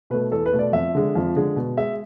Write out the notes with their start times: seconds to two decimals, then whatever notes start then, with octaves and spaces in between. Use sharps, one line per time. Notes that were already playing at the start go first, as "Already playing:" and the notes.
0.10 B2 A3 B4
0.31 E2 A4
0.46 B4
0.53 B2 A3
0.59 D5
0.73 F2 E5
0.95 D3 G#3
1.15 F2
1.36 D3 G#3
1.56 B2
1.77 G#3 E5